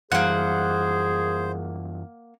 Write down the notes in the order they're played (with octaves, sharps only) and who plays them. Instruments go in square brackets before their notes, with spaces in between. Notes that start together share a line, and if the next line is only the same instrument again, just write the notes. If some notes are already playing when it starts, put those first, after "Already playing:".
[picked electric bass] F#2 E3 G3 [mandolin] A#3 F#5 [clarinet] G#4 [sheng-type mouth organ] C5